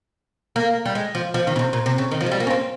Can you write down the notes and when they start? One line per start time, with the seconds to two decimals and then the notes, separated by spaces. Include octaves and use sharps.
0.56 A#3
0.86 G3
0.95 G#3
1.15 F3
1.34 F3
1.47 D#3
1.56 C#3
1.59 C3
1.73 A#2
1.86 C3
1.98 C#3
2.11 D#3
2.21 F3
2.26 G#3
2.31 G3
2.40 A#3
2.47 C#4
2.50 C4